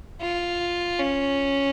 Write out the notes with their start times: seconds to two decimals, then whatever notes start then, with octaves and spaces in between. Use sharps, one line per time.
0.22 F4
0.99 C#4